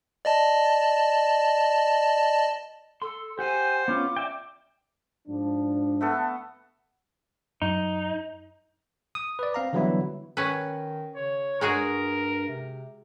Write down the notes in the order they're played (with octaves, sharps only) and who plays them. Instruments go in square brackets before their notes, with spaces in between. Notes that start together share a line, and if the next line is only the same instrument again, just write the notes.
[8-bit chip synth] D5 D#5 A5
[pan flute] A4 [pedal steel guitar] C6
[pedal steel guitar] G4 F#5 [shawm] C5 [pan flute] G#5
[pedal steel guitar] B3 C#4 F4 [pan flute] D6
[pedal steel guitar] D5 E5 G5
[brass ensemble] G#2 F3 D4
[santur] A3 B3 A4
[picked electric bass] F#2 [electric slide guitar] D#4
[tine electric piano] D#6
B4 D5
C4 F5 A#5
D3 E3 F#3 G3 B3 E4
[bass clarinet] D#3 [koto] C#4 B4
[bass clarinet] C#3 [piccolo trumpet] C#5
[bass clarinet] G2 [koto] G#3 F#4 G#4 [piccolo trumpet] A#4
[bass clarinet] C3